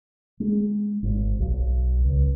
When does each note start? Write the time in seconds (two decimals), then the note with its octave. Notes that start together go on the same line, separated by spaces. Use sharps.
0.40 G#3
1.03 G#1
1.40 B1
2.04 C#2